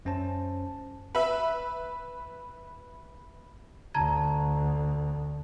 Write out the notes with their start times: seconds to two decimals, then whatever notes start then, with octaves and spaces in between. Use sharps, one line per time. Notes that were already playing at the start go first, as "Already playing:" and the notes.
0.05 F#2 C#4 C5 A5
1.15 B4 E5
3.94 D2 A5 A#5 G#6